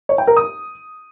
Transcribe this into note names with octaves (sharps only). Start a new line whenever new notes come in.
C#5
G5
A#4
D#6